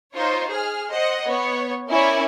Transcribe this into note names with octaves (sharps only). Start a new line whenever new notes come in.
D#4 F4 C5 C#5
G#4 F6
C5 D#5 F#5
B3 C#5
C#4 E4 A#4 C#5 D5 G#5